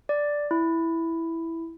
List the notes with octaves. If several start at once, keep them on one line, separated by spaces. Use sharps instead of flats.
D5
E4